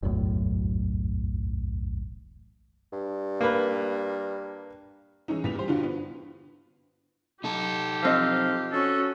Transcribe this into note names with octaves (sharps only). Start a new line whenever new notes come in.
E1 B1 F#2 A2
G2
A#3 B4
E3 G#3 C#4 D#4
A#2 B3 B6 F7
G3 C5
G2 D3 F4 F#4
B3
D#4 G4 A4
F3 C4 D#5 F5
C#4 F#4 A4